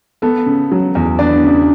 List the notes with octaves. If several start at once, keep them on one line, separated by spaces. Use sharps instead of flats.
B3 A4
C#3
F#3
E2
B3 D4 D5
C#3